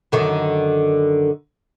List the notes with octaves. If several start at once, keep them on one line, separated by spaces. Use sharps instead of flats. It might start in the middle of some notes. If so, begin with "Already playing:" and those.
F#2 D3 D#3